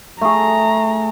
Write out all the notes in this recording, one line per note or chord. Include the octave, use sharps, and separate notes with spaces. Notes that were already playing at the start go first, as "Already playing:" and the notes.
A3 G#4 A#5